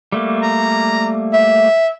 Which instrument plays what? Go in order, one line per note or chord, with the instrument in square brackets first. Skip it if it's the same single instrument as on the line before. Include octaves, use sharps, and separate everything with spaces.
[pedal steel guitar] G3 A3 A#3
[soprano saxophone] A#5
E5